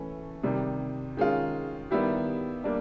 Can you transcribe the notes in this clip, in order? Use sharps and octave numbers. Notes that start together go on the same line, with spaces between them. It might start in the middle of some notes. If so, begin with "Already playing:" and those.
Already playing: E3 A3 C#4
C3 D#3 G3
D#3 G#3 C#4 F4
D#3 G3 B3 E4 G4
G3 A#3 D4